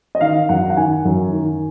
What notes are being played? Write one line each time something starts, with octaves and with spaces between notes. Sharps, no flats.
D#5
D#3 F5
F#2 F#5
F#5
D#3 G#5
F#2
D#3